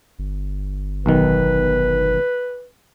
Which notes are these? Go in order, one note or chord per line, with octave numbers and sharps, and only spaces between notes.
G1
B1 D#3 B4